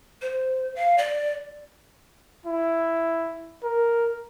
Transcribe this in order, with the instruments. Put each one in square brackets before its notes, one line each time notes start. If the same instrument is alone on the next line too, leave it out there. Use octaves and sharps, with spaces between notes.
[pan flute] C5
F5
D5
[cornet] E4
A#4